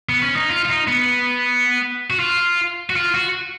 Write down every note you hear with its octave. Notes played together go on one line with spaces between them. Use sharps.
B3
C#4
D#4
F4
F4
D#4
B3
F#4
F4
F#4
F4
F#4